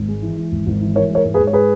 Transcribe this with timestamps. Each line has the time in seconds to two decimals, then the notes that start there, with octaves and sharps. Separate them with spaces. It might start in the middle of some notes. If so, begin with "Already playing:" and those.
Already playing: G#1
0.08 G#3
0.22 E3
0.37 E3
0.52 G#1
0.66 G#1
0.81 E3
0.95 E3 A#4 C#5
1.10 G#3 A#4 C#5
1.25 G#2
1.34 G#4 B4
1.39 G#2
1.47 C#5
1.53 G#4 B4